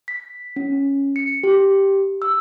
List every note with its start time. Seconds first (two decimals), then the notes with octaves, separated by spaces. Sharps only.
0.08 B6
0.56 C#4
1.16 C#7
1.43 G4
2.22 E6